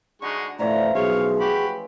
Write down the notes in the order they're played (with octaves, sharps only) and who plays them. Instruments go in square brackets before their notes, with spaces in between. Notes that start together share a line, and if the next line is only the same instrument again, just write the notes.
[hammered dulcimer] D3 F#4 [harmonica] G#3 D#4 C#6
[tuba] A2 [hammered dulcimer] E3 F3 C#4 [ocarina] D5 [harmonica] A#5
[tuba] B1 [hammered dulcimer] G#3 A3 [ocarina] G#4 [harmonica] C#5 F5
[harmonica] F#4 G4 B5